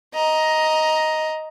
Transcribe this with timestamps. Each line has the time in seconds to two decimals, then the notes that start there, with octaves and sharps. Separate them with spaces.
0.15 D#5 A#5